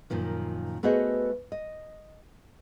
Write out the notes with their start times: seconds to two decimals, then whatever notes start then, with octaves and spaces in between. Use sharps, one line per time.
0.10 F#2 A#2 D#3 F3
0.83 A3 B3 F#4 G#4 C5 D#5
1.52 D#5